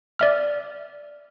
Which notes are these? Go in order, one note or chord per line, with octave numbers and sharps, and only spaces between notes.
D5 E5 F6